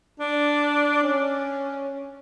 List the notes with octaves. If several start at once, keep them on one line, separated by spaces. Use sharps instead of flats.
D4
C#4